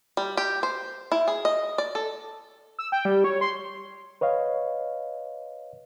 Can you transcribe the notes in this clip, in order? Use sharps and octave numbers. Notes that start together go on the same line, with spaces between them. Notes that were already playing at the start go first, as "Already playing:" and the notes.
G3
G4
C5
E4
G#4
D#5
D5
A4
E6
G5
G3
C#5
C6
B4 C#5 D#5 F5